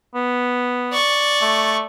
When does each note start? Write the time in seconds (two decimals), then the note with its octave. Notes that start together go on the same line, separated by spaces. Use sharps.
0.14 B3
0.93 D5 C#6
1.41 A3